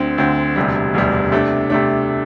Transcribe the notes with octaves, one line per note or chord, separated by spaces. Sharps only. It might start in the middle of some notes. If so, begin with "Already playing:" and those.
Already playing: D2 D3 C4
D2 D3 C4
E1 D2 C3 G3
E1 D2 C3 G3
C3 A3 D4
C3 A3 D4